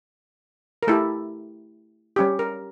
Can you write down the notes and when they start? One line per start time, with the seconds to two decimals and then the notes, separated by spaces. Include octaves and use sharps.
0.83 A#4
0.87 A3 E4 G4 A4
2.16 G3 C#4 G4
2.39 A#4